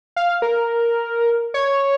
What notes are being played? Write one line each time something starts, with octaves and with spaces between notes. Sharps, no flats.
F5
A#4
C#5